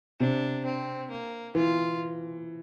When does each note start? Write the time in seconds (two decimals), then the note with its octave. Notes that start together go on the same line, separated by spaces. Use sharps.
0.20 C3 D4
0.65 C4
1.10 A#3
1.55 E3 F4